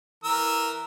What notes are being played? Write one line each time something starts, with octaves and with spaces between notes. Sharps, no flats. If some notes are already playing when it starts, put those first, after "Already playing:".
E3 A#4 E6